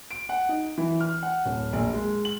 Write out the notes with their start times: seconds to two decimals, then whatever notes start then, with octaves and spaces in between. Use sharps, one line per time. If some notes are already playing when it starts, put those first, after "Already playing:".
0.11 D7
0.29 F#5
0.49 D#4
0.78 E3
1.00 F6
1.23 F#5
1.46 D1
1.73 A#1
1.94 G#3
2.25 F#7